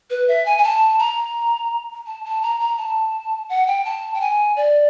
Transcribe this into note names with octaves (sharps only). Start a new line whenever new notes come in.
B4
E5
G#5
G#5
A5
A#5
A5
A5
A#5
A#5
A5
F#5
G5
A5
G5
G#5
D5